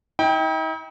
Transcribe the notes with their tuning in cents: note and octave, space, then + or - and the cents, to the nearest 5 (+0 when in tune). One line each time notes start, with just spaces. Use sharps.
D#4 +45 G5 +0